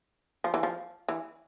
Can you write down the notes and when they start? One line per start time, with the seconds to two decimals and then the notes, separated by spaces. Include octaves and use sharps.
0.44 F3
0.54 E3
0.63 F3
1.08 E3